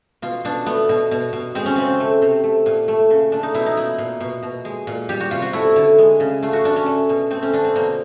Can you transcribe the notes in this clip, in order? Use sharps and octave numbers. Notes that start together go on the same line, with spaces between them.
B2 F4
B2 D4
A3 B3
B2
B2
B2
G#3 C4
C#4
C#3 C4
A3
C3
A3
A#2
A3
C#3
A3 D4
D#4
B2 E4
D#4
A#2 E4
A#2
B2
B2
G#3
A#2
G3 G4
F#4
C3 F4
F#4
A3 E4
D3
G#3
C#3
A3 F4
F#4
C#3 D4
C#4
A3
B2
A3 C4
C#4
D3 D4
C4
B2 A#3